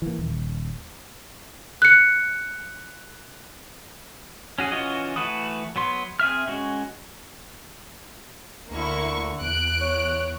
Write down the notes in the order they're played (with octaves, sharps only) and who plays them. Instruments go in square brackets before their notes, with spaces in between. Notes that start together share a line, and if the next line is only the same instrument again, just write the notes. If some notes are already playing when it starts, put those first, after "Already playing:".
[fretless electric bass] E3 A#3
D#1
[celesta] F#6 C#7
[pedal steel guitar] C#4 F#4 G#4
E3 C#4 F4 F#4 D#5
E3 A3 F#4 B4 D#6
F#3 B3 C6
C4 G#4 E5 F6
G#3 C#4 F#4
[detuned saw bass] D2 [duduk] D3 [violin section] A#3 E4 C#6
[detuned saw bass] E2 [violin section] F#6 D7
[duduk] C#5